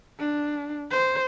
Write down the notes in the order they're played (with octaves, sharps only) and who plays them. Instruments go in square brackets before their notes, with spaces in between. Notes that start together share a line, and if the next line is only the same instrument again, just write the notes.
[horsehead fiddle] D4
C5